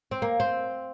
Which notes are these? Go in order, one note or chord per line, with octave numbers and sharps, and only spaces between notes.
C4
A#3
C4